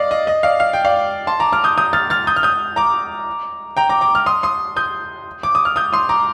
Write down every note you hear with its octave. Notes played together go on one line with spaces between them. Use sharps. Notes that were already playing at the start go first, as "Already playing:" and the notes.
Already playing: D5 D#5 F5
D#5
D#5
D5 F5
F5
G5
D5 F5
A5 C6
A#5 D6
D6 F6
D#6 G6
D#6 G6
F6 A6
F6 A6
D#6 G6
F6
D#6 G6
A#5 D6
G5 A#5
A#5 D6
A#5 D6
F6
C6 D#6
C6 D#6
D#6 G6
D6
D#6
F6
D#6 G6
C6 D#6
A#5 D6